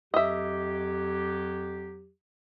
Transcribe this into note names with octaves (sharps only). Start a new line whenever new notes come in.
F2 F#3 G4 D#5 E5